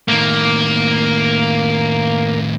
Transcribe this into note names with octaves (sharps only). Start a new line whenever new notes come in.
A2 D#3 A#3